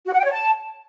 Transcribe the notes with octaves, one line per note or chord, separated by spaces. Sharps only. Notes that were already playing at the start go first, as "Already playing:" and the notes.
F#4
F#5
G5
C#5
A5